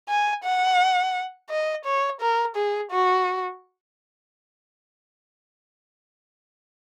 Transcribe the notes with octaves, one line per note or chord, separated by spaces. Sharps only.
G#5
F#5
D#5
C#5
A#4
G#4
F#4